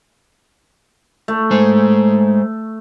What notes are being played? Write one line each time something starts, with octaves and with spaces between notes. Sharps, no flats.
A3
G#3 C5